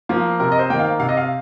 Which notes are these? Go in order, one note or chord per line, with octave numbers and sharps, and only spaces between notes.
F3 A#3
C3 A#4
D#5
C5
D#3 A#3 G5
F5
C3 F5
D#5
F5